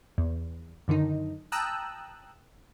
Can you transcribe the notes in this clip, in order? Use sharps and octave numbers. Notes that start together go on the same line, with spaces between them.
E2
F#2 D3 D#3 D#4
G5 A5 A#5 D#6 E6 F#6